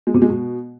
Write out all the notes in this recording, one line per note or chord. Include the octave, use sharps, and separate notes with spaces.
G#3
C3
G#3
B2